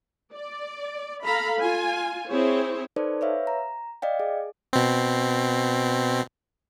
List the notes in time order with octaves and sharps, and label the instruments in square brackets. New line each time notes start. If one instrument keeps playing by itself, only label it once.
[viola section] D5
A4 F5 A#5 B5
F4 G#5
C4 E4 G#4 C5 C#5
[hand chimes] D#4 A4 B4 C5 D5
B4 C#5 E5 F5
A#5
D5 D#5 F5 G5
G#4
[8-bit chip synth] B2 C4